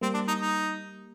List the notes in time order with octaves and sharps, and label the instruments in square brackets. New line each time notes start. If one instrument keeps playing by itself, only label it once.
[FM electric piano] G3 A#3 [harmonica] C4
[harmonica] D4
D#4
D#4